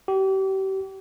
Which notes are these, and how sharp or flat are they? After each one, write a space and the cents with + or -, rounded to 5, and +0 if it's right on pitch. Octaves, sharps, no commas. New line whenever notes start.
G4 -35